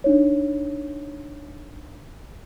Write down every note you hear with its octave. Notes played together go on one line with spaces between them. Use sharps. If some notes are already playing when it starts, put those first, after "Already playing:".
D4 D#4 C#5